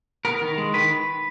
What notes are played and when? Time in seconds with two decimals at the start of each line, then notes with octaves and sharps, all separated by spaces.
0.25 B3 A#4
0.41 D#3
0.58 G#3
0.74 D#3 B4